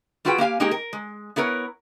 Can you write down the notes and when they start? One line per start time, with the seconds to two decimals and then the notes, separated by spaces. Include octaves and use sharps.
0.25 G3 F4 F#4 G#4 B4 G5
0.38 A#3 G4 F5 G#5
0.60 G#3 A#3 D#4 G4 G#4 A#4
0.71 A#4
0.93 G#3
1.36 B3 E4 A#4 B4 C#5